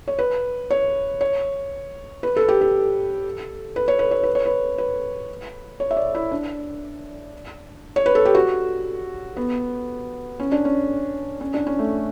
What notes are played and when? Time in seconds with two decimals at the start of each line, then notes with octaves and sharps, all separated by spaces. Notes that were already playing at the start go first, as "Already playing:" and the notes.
0.08 C#5
0.19 B4
0.70 C#5
1.21 C#5
2.23 B4
2.36 A4
2.48 G4
2.61 A4
3.76 B4
3.88 C#5
3.99 B4
4.11 C#5
4.23 B4
4.35 C#5
4.46 B4
4.78 B4
5.80 C#5
5.91 E5
5.97 D5
6.15 E4
6.31 D4
7.96 C#5
8.06 B4
8.15 A4
8.25 G4
8.35 F#4
9.37 B3
10.40 C#4
10.52 D4
10.65 C#4
11.41 C#4
11.54 D4
11.67 C#4
11.79 A3